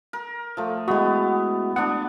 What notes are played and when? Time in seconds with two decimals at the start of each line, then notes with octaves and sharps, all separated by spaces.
0.13 A#4
0.57 F3 A3
0.88 E3 G#3 B3 F#4
1.76 B3 D4 F#5